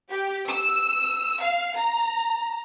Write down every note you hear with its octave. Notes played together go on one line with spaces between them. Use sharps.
G4
E6
F5
A#5